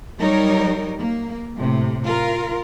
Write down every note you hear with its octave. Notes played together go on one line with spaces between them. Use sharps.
F#3 G3 D#4 A#4 C#5
A#3
A2 C3
F4 A#4